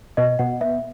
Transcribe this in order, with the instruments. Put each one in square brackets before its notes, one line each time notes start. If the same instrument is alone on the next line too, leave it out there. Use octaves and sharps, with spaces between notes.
[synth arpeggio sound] B2 [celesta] D#5
[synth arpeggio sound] B2 [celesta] F#5
[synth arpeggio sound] B3 [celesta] E5